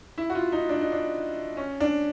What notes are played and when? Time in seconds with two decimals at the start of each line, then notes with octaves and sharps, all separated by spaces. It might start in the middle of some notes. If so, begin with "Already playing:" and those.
0.18 E4
0.30 F#4
0.35 F4
0.52 D#4
0.69 D4
0.81 D#4
0.92 D4
1.57 C#4
1.80 D4